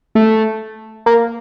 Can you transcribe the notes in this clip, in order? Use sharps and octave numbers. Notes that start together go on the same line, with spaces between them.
A3
A#3